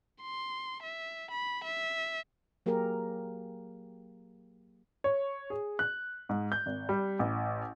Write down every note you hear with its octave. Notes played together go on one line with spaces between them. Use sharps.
C6
E5
B5
E5
F#3 A#3 G4 G#4 A#4
C#5
G#4
F#6
G#2
G6
G#1
G3
A1